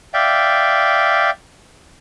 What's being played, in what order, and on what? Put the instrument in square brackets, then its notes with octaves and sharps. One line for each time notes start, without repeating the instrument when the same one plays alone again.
[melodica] D5 E5 F5 G5